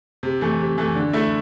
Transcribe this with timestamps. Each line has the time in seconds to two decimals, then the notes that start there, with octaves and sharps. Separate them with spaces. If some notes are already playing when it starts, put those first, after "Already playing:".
0.23 C3
0.41 E3 A3
0.59 C3
0.78 E3 A3
0.95 D3
1.13 A3 E4